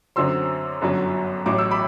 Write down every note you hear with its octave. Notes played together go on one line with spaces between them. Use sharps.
F#2 D3 F#3 C4 C6 E6
G1 F#2 D3 F#3
A1 A2 F#3 D6
E6
B5 D6